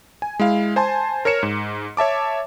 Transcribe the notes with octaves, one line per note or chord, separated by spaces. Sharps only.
G#5
G#3 E4 F5
C5 G#5 A5 C6
A#4 C#5 F6 C#7 E7
G#2
C#5 E5 A5 D6